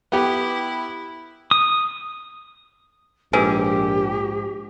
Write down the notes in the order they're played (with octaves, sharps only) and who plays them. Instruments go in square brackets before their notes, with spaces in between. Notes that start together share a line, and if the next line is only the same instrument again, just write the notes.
[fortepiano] B3 G4 [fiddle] E4
[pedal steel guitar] D#6
[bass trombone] A#1 [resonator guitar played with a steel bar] G#2 [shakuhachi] G4 [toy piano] A#4 B4 G#5